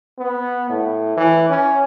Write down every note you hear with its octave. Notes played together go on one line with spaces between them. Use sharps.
B3
A2
E3
C#4